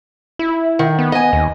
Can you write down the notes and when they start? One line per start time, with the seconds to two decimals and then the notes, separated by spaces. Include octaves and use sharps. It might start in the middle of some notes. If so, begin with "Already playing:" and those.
0.39 E4
0.79 D#3
0.99 B3
1.12 D#5 G#5
1.33 D#2